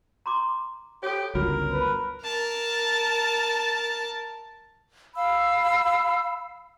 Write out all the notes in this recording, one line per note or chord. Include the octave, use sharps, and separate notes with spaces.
A#5 C6 D6
G4 A4 C#5
G1 C#2 F#3 F4 A#4
B4
A#4 A5
F5 B5 E6